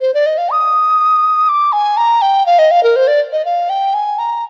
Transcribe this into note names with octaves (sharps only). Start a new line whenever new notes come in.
C5
D5
D#5
F5
D#6
D6
G#5
A#5
G5
F5
D#5
F5
A#4
C5
D5
D#5
F5
G5
G#5
A#5